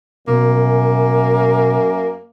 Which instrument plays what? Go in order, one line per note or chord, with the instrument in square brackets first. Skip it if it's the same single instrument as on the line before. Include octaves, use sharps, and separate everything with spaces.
[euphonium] F#2 [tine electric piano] B2 [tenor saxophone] A#3